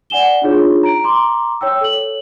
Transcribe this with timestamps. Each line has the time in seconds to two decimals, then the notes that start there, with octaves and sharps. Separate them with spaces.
0.10 D5 F#5 G#5 E7 G7
0.42 D4 D#4 F4 G#4 C#5
0.83 A#5 D7
1.04 A#5 C6 D6
1.61 C#5 G5 E6
1.81 A4 C#5 F#7